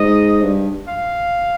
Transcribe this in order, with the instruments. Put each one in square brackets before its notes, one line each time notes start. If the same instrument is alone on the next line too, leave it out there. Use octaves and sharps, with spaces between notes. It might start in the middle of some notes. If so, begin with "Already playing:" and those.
Already playing: [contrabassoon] G#2 [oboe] D#5
[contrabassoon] G2
[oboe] F5